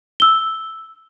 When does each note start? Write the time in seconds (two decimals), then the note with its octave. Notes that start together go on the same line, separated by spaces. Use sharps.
0.20 E6 G7